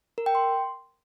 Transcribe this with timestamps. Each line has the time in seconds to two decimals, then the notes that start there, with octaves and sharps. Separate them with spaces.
0.18 A#4
0.26 G5
0.35 C6